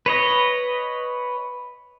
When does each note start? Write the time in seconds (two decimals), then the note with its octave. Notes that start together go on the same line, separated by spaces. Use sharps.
0.06 B4 C#5 D#5